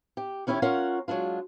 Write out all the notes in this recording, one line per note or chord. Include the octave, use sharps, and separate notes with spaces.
G4
D#3 C#4 E4 G4 C#5
C#4 F4 A#4 C#5 F#5
F#3 G#3 D4 F4